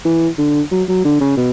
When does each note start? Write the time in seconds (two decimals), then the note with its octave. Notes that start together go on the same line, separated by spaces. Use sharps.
0.05 E3
0.38 D3
0.71 F#3
0.88 F#3
1.05 D3
1.21 C#3
1.37 B2